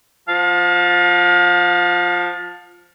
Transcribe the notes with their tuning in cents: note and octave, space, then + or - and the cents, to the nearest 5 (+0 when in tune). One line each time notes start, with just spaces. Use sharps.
F3 +0 F5 +35 A5 +0